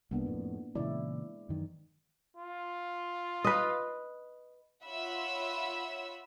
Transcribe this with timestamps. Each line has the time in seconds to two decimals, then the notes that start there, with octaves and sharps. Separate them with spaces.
0.11 C2 A#3 B3 D4
0.26 F2 A2
0.75 A#2 C#3 E3 G#3 E4 D5
1.49 F#2 D#3 E3
2.36 F4
3.44 B4 D#5
4.85 F4 C#5 E5 F#5 B5 E6